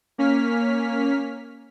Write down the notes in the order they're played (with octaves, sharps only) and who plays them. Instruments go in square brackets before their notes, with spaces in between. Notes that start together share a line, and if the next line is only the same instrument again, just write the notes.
[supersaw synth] A#3 C#4 F6 B6